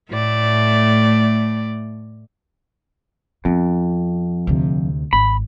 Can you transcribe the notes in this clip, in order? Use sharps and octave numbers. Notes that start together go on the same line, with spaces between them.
A2 A3 D5
F2 B3 C4
D2 C3
G#1 B5